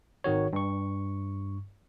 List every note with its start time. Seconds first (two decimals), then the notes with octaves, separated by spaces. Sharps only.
0.24 G#1 D#3 F#4 C#5
0.53 G2 C#6